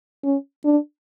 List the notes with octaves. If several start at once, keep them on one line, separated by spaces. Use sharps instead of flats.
C#4
D4